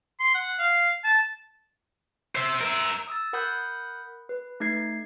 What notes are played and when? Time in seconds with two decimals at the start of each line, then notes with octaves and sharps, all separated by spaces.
0.20 C6
0.34 F#5
0.59 F5
1.04 A5
2.36 C5 E5
2.61 A#4 E5
3.08 D#6 E6 A6
3.33 A#4 F#5 B5 D#6 F#6 G6
4.29 B4
4.60 A3 D#4 G#6 C7